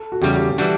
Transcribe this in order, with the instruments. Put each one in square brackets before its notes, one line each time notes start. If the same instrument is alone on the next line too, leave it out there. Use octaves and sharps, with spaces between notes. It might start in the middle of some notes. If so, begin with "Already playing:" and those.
Already playing: [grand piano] A4
F#4
[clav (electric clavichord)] E2 C#3 G3 [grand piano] G4
[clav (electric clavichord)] E3 G3 D4 F#4